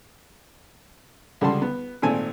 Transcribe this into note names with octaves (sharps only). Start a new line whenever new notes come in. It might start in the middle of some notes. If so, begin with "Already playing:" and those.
C#2 D3 G3 F#5 A5 C6
B3
G#1 A#2 A3 C4 G#5 A5